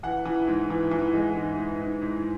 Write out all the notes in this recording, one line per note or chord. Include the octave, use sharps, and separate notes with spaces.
E3 F#5
E3
G#2
E3
E3
G#3
G#2
G#2
G#2
G#2